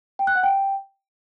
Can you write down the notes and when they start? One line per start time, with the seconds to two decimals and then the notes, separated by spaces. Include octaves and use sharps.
0.19 G5
0.27 F#6
0.35 F#5
0.43 G5